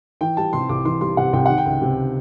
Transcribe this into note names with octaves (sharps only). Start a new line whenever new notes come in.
E3 G5
G3 A5
C3 C6
C2 D6
E3 C6
G3 C6
C3 F#5
C2 G5
D#3 F#5
G5
C#2
C3